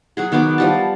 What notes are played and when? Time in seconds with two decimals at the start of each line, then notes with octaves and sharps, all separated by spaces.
0.17 F#3 F#4 G#4
0.32 D#3 B3 F#4 D6
0.58 F3 G3 A5